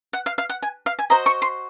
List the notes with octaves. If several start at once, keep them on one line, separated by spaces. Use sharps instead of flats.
F#5
F5
F5
F#5
G#5
F5
G#5
F#4 C5 D#5 A#5
C#6
C6